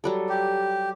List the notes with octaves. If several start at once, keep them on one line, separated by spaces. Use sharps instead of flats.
F#3 G3 A4
G4